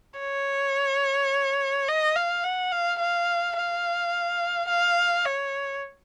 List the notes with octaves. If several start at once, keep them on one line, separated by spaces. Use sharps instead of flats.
C#5
D#5
F5
F#5
F5
F5
F5
F5
C#5